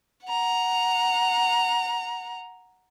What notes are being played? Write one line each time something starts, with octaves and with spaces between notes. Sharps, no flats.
F#5 A#5